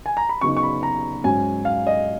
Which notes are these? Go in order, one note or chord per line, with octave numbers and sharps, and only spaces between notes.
G#5
A#5
B5
C#3 F#3 B3 D#4 C#6
C#6
B5
A#5
G#2 F#3 C#4 G#5
F5
D#5